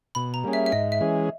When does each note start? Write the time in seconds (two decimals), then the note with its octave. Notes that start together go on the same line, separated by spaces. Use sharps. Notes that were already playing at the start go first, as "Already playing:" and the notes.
0.15 B2 B5
0.34 A#5
0.44 G3 A#3 C#4 G#4
0.53 E5
0.66 E5
0.72 G#2 D#5
0.92 E5
1.01 E3 G#3 C#4 G#4